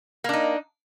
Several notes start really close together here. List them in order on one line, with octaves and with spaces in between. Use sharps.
A#3 D4 D#4